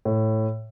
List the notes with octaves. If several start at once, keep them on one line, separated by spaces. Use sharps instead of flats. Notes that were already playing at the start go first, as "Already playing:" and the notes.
A2